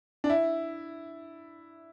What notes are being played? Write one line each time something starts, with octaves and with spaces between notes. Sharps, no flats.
D4
E4